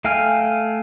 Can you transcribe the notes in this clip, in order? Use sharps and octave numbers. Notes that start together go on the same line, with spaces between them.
A3 F5 G5 G#5 F6